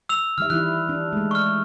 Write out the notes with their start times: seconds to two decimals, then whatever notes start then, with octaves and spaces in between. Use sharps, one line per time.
0.09 E6 F7
0.38 D#3 G3 E5 F6
0.50 E3 E4 F#6
0.89 D4
1.13 G#3 A3
1.31 C#6 F6